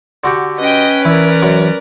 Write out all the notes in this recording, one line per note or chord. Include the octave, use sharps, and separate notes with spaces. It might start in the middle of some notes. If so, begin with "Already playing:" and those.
D3 F#4 G4
C#4 B4 D#5 G5
E3 E4 A#4 D5
F#2 F#5